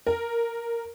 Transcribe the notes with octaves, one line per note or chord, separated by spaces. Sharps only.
A#4